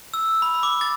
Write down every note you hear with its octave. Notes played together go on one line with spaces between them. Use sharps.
E6
B5
D6
A6